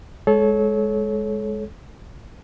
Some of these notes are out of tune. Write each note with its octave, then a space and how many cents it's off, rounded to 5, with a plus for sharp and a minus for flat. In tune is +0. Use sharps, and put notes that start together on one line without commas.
G#3 +0 A4 -30 C#5 +0